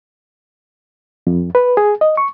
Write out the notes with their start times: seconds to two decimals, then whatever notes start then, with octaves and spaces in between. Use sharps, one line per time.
1.27 F2
1.55 B4
1.77 G#4
2.01 D#5
2.17 C#6